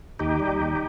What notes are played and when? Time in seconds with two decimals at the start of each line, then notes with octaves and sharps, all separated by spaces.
0.19 D#2 D#4 G4
0.40 G3
0.60 D#2